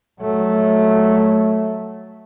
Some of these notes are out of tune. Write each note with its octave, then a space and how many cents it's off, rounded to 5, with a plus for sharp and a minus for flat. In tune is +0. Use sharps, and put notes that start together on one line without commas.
F#3 +0 A3 -10